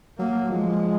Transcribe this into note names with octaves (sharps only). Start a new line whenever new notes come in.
F#3 A#3
F3 G#3